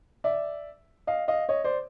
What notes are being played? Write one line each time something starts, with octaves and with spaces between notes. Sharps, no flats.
D5 E5
D#5 F5
D#5 F5
C#5 D#5
C5 D5